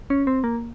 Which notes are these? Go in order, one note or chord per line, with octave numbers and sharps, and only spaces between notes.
C#4
C4
A#3